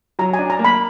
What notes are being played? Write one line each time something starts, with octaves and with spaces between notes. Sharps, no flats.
F#3 A#5
G#5
D4
A#5
A#3
B5